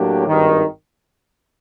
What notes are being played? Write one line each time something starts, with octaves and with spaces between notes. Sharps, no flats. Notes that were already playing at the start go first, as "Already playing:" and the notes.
Already playing: A2 F#3 A#3 D4 G4
G#1 G2 D#3